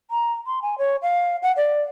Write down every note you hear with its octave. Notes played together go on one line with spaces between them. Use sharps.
A#5
C6
G#5
C#5
F5
F#5
D5